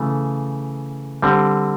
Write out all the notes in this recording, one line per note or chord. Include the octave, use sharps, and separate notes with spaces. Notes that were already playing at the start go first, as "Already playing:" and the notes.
Already playing: C#3 E3 A3
D3 G3 C4